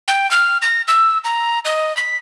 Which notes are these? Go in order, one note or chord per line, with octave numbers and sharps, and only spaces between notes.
G5
F6
A#6
E6
A#5
D#5
B6